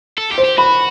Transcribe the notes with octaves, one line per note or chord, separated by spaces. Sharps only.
A4
G4
C5
G4
F#4 B5